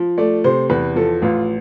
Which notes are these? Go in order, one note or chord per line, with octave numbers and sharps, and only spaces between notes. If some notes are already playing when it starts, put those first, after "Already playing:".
Already playing: F3
A3 D5
C3 C5
E2 B4
F3 A4
A1 F4